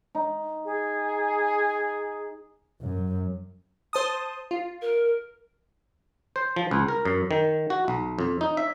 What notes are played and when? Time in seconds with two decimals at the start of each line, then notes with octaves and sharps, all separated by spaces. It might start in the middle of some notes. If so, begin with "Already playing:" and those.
0.15 D#4
0.65 G#4
2.81 F#2
3.93 C5 A5 D#6
4.51 F4
4.81 A#4
6.36 C5
6.56 F3
6.71 C#2
6.88 A#4
7.05 F#2
7.31 D#3
7.70 F#4
7.88 B1
8.19 F2
8.41 D#4
8.57 E5